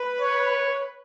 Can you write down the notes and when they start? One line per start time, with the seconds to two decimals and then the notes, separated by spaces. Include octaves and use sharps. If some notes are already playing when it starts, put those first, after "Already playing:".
Already playing: B4
0.21 C#5